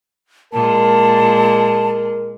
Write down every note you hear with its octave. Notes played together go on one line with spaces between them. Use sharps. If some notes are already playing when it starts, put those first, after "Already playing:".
A#2 G#3 A#4 A5